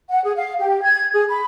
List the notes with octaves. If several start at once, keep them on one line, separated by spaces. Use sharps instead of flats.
F#5
G#4
F5
G4
G#6
G#4
B5